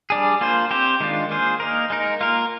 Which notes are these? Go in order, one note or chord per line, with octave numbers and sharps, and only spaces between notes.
G3 D4 G#4
A#3 F4 C5
C4 G4 C5
D#3 G#3 D4 F4
A#3 F4 G#4 C5
A#3 D#4 A#4
G#3 D#4 A#4
A#3 F4 A#4